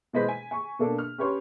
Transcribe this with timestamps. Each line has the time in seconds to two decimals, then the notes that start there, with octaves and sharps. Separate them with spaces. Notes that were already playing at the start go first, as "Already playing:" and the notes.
0.13 B2 E3 G#3 B4 C5 B6
0.29 G#5
0.51 G#5 C#6
0.79 B2 A#3 D4 A4
0.98 F6
1.18 C#4 G4 B4 C#5 C6